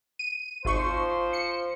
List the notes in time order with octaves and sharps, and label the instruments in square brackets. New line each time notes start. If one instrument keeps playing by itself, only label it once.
[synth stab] D#7
[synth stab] G#1 C#6 [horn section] F3 C5
[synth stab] C#7